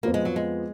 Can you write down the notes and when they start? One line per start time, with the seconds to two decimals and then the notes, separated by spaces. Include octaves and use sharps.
0.03 F2 F3 A#3 B3 F4
0.14 G#3
0.25 F#3
0.36 G#3